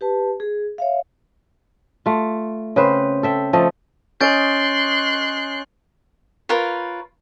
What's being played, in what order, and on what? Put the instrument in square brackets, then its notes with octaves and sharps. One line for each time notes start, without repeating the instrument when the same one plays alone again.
[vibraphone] G4 B4 A5
G#4
C#5 E5 F5
[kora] A3 F4
C#3 C4 B4 C5
A4 E5 G5
F3 A3 A4 D#5
[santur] C#4 D#5 [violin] C6 F#6 [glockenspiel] G6 A6 D7
[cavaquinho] F4 A#4 B4 C#5